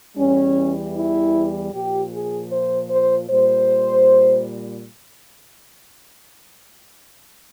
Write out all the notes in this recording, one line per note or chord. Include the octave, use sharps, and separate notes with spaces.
E2 E3 G3 C#4
E4
A#2 F3 G4
G#4
C5
C5
A#2 G3 C5